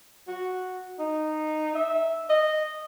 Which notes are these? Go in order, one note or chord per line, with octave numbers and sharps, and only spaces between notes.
F#4
D#4
E5
D#5